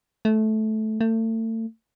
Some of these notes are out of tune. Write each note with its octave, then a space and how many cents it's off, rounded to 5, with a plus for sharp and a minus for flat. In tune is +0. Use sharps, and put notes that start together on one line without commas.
A3 -15
A3 +35